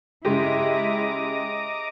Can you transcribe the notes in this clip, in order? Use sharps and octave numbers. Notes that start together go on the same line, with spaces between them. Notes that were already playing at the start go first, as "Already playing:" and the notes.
C#3 G#3 E4 G4 D#5 A#5 D6